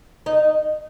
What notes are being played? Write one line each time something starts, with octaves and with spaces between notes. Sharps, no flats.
D#4